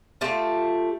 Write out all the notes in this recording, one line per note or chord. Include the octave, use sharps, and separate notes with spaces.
A3 F4 G4 A5